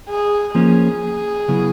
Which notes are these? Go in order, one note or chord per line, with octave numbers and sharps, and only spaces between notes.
G#4
F3 A#3 C#4 G#4
C#3 F#3 B3 E4